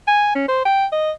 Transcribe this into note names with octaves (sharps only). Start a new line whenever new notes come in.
G#5
C#4
C5
G5
D#5